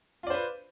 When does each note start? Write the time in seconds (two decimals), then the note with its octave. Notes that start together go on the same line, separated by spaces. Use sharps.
0.23 F4
0.27 D5
0.30 C5
0.34 B4